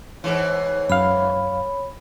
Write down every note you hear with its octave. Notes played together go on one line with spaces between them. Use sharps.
G#2 E3 C#5
F#2 F5 B5